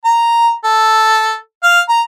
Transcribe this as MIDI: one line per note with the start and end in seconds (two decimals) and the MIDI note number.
0.05 0.52 82
0.64 1.35 69
1.64 1.80 77
1.89 2.01 82